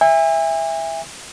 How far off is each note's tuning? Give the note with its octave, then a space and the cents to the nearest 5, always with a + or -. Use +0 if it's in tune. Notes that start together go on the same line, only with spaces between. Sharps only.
E5 +0 G#5 -40